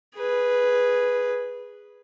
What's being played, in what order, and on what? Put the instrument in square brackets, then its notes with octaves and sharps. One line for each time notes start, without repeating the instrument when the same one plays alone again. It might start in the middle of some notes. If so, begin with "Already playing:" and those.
[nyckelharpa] G#4 B4